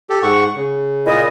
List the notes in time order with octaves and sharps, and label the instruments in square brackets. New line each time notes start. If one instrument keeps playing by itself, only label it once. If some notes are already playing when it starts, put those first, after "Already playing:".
[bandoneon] G4 A4
G#2 F#5 C#6
C#3
[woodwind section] A#2 E4 D#5